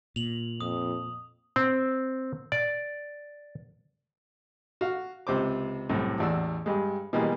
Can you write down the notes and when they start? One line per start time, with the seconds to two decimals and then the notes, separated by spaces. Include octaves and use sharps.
0.16 A#2 F7 F#7
0.60 F2 D#6
1.56 C4
2.52 D5
4.81 F#4 F5
5.27 C#2 C3 C5 D6
5.89 C2 F#2 A2
6.19 A1 E2 D5 F#5 E6
6.66 G2 G3 G#3
7.13 B2 E3 G3 G#3 A#3